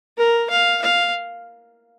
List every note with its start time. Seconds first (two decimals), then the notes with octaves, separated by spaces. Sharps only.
0.18 A#4
0.50 F5
0.82 F5